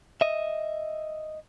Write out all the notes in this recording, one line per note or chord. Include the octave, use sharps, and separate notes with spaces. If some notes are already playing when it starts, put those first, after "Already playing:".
D#5 E5